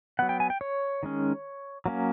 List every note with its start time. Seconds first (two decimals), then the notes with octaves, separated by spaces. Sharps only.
0.19 F#3 B3 F#5
0.29 G5
0.40 G#5
0.50 G5
0.61 C#5
1.03 D#3 G#3 C#4
1.86 F#3 A#3 C#4